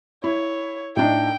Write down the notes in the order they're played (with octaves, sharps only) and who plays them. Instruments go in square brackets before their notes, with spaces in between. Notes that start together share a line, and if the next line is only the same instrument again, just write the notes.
[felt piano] E4 [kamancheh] C#5
[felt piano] A2 D4 D#4 [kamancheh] G5